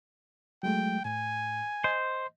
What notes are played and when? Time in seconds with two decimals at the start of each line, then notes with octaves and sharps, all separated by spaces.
0.63 F#3 G#3 A3 G5
1.05 A2 G#5
1.84 C5 D#5